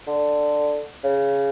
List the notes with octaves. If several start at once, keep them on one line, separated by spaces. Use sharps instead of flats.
D3
C#3